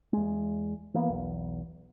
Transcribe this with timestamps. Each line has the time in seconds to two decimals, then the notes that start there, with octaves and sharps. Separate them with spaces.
0.13 E2 G#3
0.94 E3 A#3 B3
1.09 B1 E2